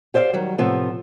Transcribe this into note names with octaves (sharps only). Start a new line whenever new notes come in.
G4 C5 D5 D#5 F5
D#3 F#3 G3
A2 C3 F3 B3